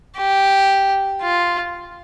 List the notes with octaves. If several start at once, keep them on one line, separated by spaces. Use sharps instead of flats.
G4
F4